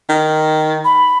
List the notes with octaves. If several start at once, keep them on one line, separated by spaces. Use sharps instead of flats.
D#3
B5